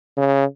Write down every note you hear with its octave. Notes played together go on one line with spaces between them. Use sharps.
C#3